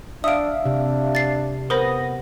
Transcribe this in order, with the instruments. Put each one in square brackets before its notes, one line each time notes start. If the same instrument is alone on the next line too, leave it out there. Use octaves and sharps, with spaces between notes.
[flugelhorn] D4 [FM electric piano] E5 F5 [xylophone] D#6 D7
[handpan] C3 [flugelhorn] D4
[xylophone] A6 C7
[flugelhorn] B3 [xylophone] A#4 C5 B5 [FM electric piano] D#6 A#6